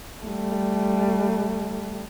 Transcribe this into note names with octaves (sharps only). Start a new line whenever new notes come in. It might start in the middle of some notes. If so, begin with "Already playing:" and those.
G3 A3